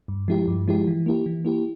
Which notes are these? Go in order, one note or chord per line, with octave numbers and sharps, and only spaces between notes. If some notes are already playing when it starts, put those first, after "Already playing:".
G2
F3 G#3 E4 G4
G2
F3 G#3 E4 G4
E3
A#3 E4 G4
E3
A#3 E4 G4